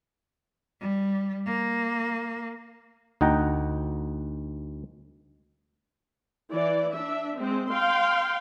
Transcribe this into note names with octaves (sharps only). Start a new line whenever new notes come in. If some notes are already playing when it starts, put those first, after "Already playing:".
G3
A#3
D2 D#4 F#5 G5 A#5
E3 D5
D4 E5
G#3 C4
F5 G5 C6